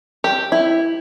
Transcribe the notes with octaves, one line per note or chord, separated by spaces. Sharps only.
G4
E4